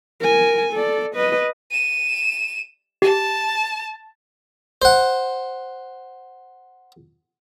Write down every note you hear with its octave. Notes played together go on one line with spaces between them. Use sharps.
A#4 G#5
A4 D5
B4 D#5
D#7 E7
G4 A5
C5 F#5